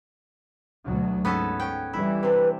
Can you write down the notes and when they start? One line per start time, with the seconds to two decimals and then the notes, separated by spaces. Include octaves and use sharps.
0.86 D2 B2 F#3
1.25 G#2 B3 C#4 A4
1.60 C#4 G5
1.93 E3 G3 E4
2.23 C3 D4 B4